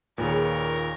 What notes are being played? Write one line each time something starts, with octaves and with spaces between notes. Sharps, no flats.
D#2 A#2 G#4 A#4 B4 C#5